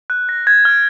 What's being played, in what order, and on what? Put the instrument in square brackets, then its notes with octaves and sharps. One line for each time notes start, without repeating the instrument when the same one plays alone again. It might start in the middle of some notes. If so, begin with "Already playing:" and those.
[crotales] F#6
A#6
G#6
F6